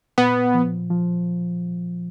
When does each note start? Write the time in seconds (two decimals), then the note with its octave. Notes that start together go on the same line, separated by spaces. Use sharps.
0.18 A#2 B3
0.54 F3
0.90 F3